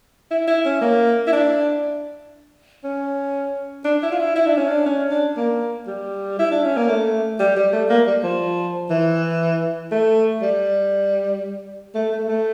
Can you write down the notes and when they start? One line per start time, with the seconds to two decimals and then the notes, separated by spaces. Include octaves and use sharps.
0.31 E4
0.48 E4
0.65 C#4
0.81 A#3
1.27 E4
1.32 D4
2.84 C#4
3.85 D4
4.03 E4
4.12 F4
4.19 E4
4.36 E4
4.47 D4
4.57 C#4
4.68 D4
4.86 C#4
5.11 D4
5.37 A#3
5.87 G3
6.39 E4
6.51 D4
6.64 C#4
6.77 A#3
6.89 A3
7.40 G3
7.56 G3
7.73 A3
7.89 A#3
8.07 G3
8.23 F3
8.90 E3
9.91 A3
10.42 G3
11.94 A3
12.11 A3
12.28 A3